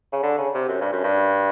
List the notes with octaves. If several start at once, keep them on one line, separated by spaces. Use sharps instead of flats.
C#3
D3
C#3
C3
F#2
G2
F#2
G2